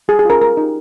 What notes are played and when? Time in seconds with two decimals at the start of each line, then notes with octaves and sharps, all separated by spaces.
0.08 G3 G#4
0.19 G#4
0.25 C#4 F4 A#4
0.41 G#3 A#4
0.57 D#4 G4